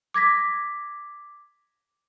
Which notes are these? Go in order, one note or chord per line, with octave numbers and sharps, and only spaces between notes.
D6 G#6 A#6 B6